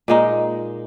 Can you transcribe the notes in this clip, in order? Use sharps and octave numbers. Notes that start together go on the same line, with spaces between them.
A#2 G#3 D#4